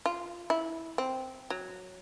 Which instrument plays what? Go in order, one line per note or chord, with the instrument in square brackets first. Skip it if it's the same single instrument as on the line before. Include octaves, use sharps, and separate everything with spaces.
[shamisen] F4
E4
C4
F#3